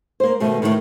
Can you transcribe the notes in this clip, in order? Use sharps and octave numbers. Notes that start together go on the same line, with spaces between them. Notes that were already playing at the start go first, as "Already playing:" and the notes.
A#3 C5
G2 B2 D#3 A3
A2 D#3 G3 A3